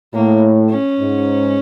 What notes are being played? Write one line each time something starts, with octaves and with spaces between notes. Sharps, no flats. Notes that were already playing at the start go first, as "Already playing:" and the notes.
A2 A#3
C#4
G#2